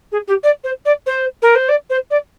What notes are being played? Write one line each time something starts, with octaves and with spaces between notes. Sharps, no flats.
G#4
G4
D5
C5
D5
C5
A#4
C5
D5
C5
D5